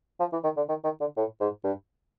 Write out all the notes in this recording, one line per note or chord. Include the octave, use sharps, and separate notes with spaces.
F3
E3
D#3
D3
D#3
D#3
D3
A2
G#2
G2